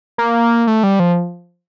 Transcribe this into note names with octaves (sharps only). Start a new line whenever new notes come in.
A#3
A3
G3
F3